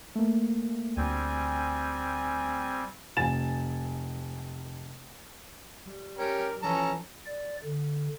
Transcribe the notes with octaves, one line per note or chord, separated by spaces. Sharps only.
A3 A#3
D2 G3 C4 G#5
F1 G#5 A6 E7
G3
C#4 G4 A#4
E3 F3 C#4 A4 A5 A#5
D5
D3